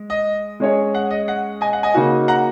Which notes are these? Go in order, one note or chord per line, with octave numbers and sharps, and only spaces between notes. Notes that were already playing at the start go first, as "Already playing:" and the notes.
Already playing: G#3
D#5
G#3 C#4 G#4 C#5
F#5
D#5
F#5
D#5 G#5
F#5
D#5 G#5
C#3 A#3 D#4 F#4
F#5 A#5